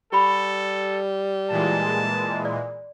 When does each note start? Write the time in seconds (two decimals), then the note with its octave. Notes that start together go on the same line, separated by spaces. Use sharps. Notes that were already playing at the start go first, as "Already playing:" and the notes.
0.13 G3 G4 A4 B5
1.50 A#2 E3 G#3 A5
2.45 D5